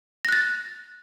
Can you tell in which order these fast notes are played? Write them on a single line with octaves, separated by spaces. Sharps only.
A#6 F#6 A6